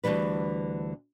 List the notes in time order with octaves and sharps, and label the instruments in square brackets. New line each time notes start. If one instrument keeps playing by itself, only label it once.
[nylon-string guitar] D2 D3 E3 G3 B4